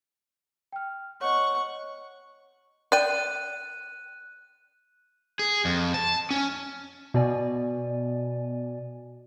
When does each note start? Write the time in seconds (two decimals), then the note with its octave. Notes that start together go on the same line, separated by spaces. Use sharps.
0.72 G5 F6
1.21 C#5 D#5 F#5 C#6
2.92 D5 G5 F#6 D#7
5.39 G#4
5.65 F2
5.94 A5
6.31 C#4
7.14 B2 B3 D5 G#5